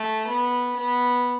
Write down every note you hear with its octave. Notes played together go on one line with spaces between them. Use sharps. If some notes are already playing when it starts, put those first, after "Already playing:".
Already playing: A3
B3
B3